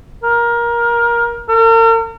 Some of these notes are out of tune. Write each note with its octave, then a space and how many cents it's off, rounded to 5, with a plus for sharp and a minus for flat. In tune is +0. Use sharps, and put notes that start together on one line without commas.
A#4 +20
A#4 -45